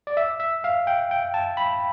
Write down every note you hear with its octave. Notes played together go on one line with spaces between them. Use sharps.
D5
E5
E5
F5
G5
G5
A5
B5